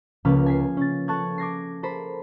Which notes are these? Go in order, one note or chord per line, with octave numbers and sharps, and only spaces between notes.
C#2 F3 A#3 C#4 B4 F6
G#5 B6 C7
C#4 A6
A4 A5 C#6 F#6 G#6
D6 G#6 A#6 C7
A4 A#4 C5 B5